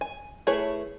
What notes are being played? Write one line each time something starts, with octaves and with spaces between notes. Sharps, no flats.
G#5
A3 E4 G#4 B4 C#5